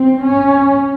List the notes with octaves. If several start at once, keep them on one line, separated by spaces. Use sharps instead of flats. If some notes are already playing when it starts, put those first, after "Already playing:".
Already playing: C4
C#4